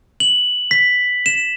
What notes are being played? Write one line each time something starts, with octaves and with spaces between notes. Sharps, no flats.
F#7
B6
E7